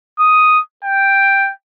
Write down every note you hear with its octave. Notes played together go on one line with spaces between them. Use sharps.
D#6
G5